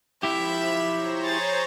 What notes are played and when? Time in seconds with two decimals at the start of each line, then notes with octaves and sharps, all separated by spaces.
0.23 F3 E4 G4 E5 B5 E7
0.90 C5 C#5 A#5
1.24 G#4 A6